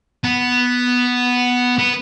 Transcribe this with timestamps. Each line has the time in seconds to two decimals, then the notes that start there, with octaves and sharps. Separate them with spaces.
0.24 B3
1.78 B3